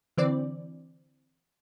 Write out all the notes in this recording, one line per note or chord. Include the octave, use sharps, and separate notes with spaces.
D3 E3 C4 D5